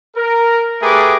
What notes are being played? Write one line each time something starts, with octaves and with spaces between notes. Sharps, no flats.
A#4
A3 G4 G#4 A#4 B4 D6